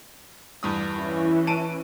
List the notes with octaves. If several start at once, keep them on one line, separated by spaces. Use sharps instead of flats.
E2 G2 D#6
E3 C#4
A5 D7 D#7